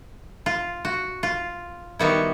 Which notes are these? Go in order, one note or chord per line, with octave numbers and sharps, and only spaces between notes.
F4
F#4
F4
D#3 G3 B3 E4 F#4